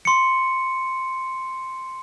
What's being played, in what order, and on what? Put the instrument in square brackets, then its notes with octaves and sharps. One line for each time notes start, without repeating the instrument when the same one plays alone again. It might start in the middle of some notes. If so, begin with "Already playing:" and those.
[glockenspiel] C6 C#7